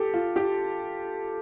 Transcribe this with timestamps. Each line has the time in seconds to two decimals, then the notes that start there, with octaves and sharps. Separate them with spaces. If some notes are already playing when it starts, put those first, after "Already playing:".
Already playing: G4 A4
0.14 F4
0.36 G4